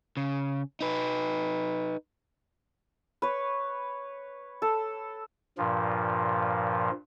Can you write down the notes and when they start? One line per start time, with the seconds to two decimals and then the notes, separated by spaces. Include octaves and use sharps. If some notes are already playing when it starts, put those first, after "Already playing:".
0.17 C#3
0.81 D#4 B4
3.22 B4 C#5
4.62 A4
5.58 G2 A#2 F3